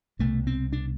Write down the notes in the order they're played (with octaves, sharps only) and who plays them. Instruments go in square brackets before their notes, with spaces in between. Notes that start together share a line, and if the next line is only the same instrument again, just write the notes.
[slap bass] C2 B2 A3
C4
D4